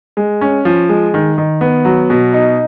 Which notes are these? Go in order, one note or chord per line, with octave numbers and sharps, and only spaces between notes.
G#3
C#4
F3
G#3
D#3
D#3
B3
F#3
B2
D#4